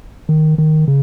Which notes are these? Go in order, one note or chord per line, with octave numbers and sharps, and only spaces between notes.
D#3
D#3
C#3